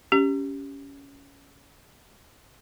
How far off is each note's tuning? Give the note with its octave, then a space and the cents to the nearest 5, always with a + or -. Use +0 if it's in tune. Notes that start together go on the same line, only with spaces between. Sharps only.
C#4 +15 G4 +0